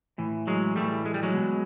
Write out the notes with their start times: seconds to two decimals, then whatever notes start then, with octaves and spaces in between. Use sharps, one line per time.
0.18 A2 E3
0.47 F#3 G#3
0.76 A2 E3 G3 A3
1.06 G#3
1.14 G3
1.23 F#3 G#3
1.34 B2